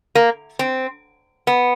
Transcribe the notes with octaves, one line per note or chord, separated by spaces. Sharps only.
A#3
C4
B3